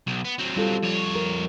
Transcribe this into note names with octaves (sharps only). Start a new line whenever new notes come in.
B1
B3
F#3 C4
G3 F4 A4
F2 C#5
A#4